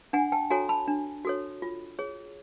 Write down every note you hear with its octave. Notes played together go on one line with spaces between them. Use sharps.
D4 F#5 G#5
G5 A5
F#4 A4 C#5 G#5 A#5
A5 B5
D4
F#4 A4 C#5
F4
G#4 C#5